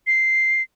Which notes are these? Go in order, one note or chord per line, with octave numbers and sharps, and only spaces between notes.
C7